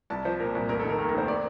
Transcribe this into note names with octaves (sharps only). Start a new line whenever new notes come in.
C2 A5
F3 C5
A#2 A#4
C2
F1 A#4
A4
D#3 A#4
D#2 A#4
A#4
F1 C5
D5